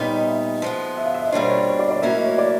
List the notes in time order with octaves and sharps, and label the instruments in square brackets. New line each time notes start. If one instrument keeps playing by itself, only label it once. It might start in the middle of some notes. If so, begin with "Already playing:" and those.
Already playing: [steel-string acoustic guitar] A#2 G3 B3 D#4 [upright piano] C#5
[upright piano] D#5
E5
[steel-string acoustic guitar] F3 G#3 B3
[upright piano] E5
F5
E5
D#5
[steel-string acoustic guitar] B2 G3 A#3 D4 F4 [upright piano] C#5
[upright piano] C5
C#5
C5
C#5
D5
D5
[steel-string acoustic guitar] A2 F#3 A#3 C#4 E4 [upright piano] E5
[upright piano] D#5
C#5
D5